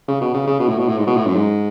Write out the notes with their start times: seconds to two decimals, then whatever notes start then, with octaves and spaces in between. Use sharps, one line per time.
0.08 C#3
0.21 B2
0.34 C#3
0.47 C#3
0.59 B2
0.69 A2
0.78 B2
0.88 A2
0.98 G#2
1.07 B2
1.16 A2
1.26 F#2
1.36 G#2